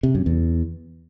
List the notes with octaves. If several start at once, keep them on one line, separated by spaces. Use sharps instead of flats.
C3
F#2
E2